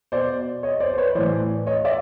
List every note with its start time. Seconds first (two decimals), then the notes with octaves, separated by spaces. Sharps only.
0.12 B2 C5 D5
0.63 C#5 D#5
0.80 C5 D5
0.93 C5
0.98 B4 C#5
1.15 A2 E3 C5 D5
1.66 C#5 D#5
1.85 D5 E5